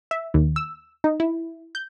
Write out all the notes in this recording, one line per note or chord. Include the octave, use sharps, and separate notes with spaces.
E5
D#2
E6
D#4
E4
G6